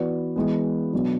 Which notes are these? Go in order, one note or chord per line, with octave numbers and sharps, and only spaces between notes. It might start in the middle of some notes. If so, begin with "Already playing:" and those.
Already playing: E3 B3 F#4 B4 D5
E3 G#3 B3
B2 F#3 B3 D4